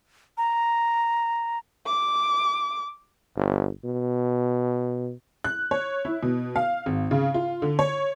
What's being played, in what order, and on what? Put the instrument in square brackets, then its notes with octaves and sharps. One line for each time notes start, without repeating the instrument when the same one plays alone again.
[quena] A#5
[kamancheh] D6
[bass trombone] G1
B2
[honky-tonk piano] F#6
C#5
E4
B2
F5
G#1
C#3
F4
D3
C#5